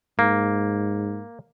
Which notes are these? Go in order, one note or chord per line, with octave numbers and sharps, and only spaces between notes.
G#2 A#3